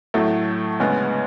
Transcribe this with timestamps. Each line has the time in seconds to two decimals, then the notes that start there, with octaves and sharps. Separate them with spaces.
0.14 A2 F#3 A3
0.80 D2 C#3 G#3 B3